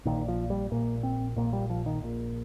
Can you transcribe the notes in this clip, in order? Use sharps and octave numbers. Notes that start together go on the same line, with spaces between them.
A#1 A#2 D#3
F3
G3
A#1 A#2 A#3
C4
A#1 A#2 A#3
G3
F3
D#3
A#1 A#2